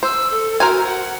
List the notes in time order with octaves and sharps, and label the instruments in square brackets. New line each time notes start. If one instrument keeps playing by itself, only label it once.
[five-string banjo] C5 [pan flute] E6
[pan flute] A4
[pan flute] F#4 [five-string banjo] A#4 C5 G#5
[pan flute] F#5